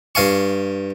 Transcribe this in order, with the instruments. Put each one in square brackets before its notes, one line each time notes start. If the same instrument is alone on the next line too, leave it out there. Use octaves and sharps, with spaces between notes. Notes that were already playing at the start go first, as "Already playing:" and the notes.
[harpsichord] G2 F5 G#5 C#6